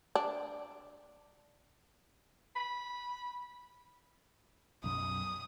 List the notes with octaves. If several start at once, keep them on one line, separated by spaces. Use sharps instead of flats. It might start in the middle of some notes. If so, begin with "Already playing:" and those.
D4
B5
B1 F#2 D#6